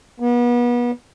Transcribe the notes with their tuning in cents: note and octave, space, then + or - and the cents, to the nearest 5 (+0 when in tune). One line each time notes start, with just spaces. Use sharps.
B3 -35